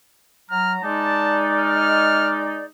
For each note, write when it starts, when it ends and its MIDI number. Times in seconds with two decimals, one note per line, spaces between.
0.50 0.79 54
0.50 0.79 82
0.50 0.74 89
0.83 2.65 56
0.83 2.65 63
0.83 2.65 74
0.83 1.41 81
1.59 2.35 89